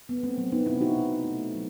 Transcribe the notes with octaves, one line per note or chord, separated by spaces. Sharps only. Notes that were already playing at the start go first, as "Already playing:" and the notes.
A3 B3
C4
F#3 C4
B3 D#4
C3 C4 E4
D#4 F#4
B2
A3
F#3